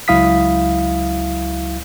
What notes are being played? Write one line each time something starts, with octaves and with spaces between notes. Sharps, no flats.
C#2 F#3 E4 F5 D#6 B6